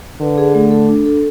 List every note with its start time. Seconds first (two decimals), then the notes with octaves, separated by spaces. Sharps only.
0.21 D3 B4
0.38 G#4
0.55 A3
0.71 A4
0.89 D4
1.05 A4